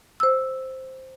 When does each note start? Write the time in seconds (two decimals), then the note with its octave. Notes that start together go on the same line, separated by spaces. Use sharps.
0.20 C5 E6